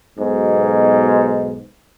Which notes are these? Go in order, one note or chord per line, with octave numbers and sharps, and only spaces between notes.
B1 G#2 B2